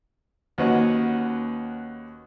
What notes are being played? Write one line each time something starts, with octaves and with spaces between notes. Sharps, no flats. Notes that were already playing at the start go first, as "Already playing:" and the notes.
D#2 C#4 F#4 B4 D#5 F#5